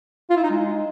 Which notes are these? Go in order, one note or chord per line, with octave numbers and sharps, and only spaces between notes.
F4
E4
D#4
G#3